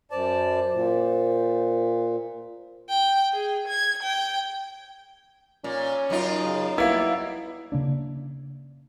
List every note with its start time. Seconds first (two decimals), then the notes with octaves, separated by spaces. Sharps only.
0.11 F#2 C5 D5 A5
0.73 A#2
2.90 G5
3.33 G#4
3.68 G#6
4.03 G5
5.64 A#2 C#4
6.10 F#2 D#4 F4
6.44 C#3
6.78 G3 A#3 B3 E4
7.72 C#3 A#3 D4